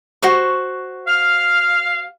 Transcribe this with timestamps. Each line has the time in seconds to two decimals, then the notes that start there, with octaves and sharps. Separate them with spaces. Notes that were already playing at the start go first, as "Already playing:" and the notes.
0.22 F#4 C5 C#6
1.07 F5 F6